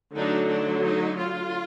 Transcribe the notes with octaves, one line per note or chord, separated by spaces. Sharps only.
D3 F#3 A3 D4 D#4
D4
D#4
F4